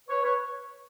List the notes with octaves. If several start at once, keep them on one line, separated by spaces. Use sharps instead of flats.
B4 C#5
B4 C#5